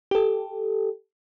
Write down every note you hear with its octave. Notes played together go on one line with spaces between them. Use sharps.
G4 A4